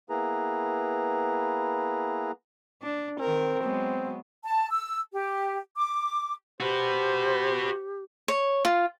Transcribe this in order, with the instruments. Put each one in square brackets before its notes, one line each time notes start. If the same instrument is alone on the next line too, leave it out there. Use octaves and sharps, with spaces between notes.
[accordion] A#3 B3 E4 G#4 B4 A#5
[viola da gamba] D4
[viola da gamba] D#3 A#4 [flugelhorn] C4
[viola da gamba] F#3 G#3 B3
[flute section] A5
E6
G4
D6
[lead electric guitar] F#4 B4 [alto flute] G4 [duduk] C5
[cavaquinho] C#5
F4